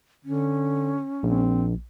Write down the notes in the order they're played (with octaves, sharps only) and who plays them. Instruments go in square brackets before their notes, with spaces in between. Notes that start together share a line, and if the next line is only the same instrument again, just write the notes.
[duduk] D3 [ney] C#4
[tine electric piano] A#1 [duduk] C4